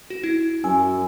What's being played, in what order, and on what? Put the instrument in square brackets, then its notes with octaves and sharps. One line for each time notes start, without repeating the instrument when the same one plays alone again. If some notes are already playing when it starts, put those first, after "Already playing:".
[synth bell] F#4
E4
[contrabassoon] F#2 [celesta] G#5 [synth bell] E6